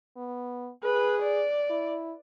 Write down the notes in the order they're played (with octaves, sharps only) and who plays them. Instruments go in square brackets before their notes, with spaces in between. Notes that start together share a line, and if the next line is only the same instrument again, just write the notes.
[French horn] B3
[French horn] G#4 [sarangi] B4
[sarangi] D5
[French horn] E4